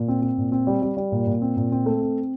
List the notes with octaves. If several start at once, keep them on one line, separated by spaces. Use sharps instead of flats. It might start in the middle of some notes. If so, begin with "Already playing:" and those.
Already playing: A#2
C4
C4
A#2
C4
G3
G3
G3
A#2
A#2
C4
A#2
C4
A3
C4